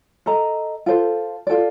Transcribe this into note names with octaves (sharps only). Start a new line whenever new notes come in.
A4 D#5 A#5
F4 A4 C5
F4 A4 D5